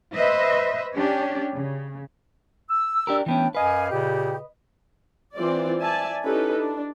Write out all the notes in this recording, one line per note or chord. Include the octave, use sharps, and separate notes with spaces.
B4 C5 D#5 E5
C#4 D4 G4
C#3
E6
D4 G4 A#4
E3 A3 B3 C#4 D4 G5
F#2 B4 D#5 F5 G#5
A#2 C#3 G4
E3 C4 F4 D5
D5 E5 G#5 A5
C#4 D#4 E4 G4 A4 B4
D4